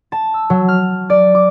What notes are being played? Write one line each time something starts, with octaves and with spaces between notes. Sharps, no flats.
A5
E6
F#3
F6
D5
D6